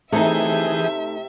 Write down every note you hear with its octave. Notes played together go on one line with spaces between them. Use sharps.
C3 E3 A3 D#4 G#4 E5 G6